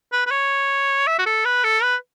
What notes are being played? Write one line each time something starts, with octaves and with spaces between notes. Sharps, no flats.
B4
B4
C#5
E5
F#4
A4
B4
A4
B4